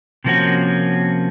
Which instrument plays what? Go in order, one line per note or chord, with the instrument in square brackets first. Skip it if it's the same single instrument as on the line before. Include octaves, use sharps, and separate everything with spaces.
[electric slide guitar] C3 F3 A#3 C#4 F#4